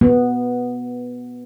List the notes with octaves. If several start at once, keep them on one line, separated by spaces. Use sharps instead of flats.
B3